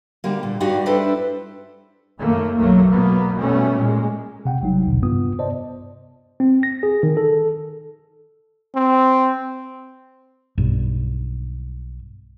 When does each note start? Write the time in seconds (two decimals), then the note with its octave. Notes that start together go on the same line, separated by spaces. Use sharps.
0.24 D3 G3 A#3
0.43 A#2
0.60 G2 D#4 F#4 G4 D5 F5
0.86 G2 D4 E4 A4 B4 C5
2.19 F#2 D#3 A3 A#3
2.58 B1 G2 F#3 A3 A#3
2.91 B2 F#3 A#3 B3
3.35 B2 G3 A3 C#4
3.79 A#2 G#3
4.45 C3 F#5 G5
4.62 G#1 F#3 G3 D#4
4.87 A#1 D#2 B2 D3
5.02 G2 C3 B3 F4 D#6
5.39 C5 D5 D#5 A5
6.40 C4
6.63 A#6
6.83 G#4
7.03 D#3
7.17 A4
8.75 C4
10.58 B1 G2